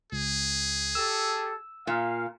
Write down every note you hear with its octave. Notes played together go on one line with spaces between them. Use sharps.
C#2 G#4
G4 A4 E6
A#2 F5